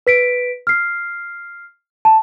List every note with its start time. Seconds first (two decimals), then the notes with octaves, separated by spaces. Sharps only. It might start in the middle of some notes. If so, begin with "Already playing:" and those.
0.07 B4 B6 D7
0.67 F6 C7
2.05 A5